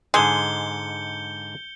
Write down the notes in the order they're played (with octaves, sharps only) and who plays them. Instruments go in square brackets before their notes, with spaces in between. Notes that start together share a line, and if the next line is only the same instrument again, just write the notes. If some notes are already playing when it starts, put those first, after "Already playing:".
[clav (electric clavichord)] G#2 D3 G#4 [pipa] G#3 [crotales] G6 C#7 G7